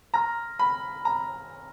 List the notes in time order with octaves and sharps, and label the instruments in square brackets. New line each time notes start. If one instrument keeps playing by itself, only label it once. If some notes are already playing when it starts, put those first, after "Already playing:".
[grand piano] A#5 [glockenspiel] C6 F6 A#6
[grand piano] B5
A#5